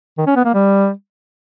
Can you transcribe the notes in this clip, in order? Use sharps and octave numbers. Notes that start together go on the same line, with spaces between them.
D#3
C#4
B3
A#3
G3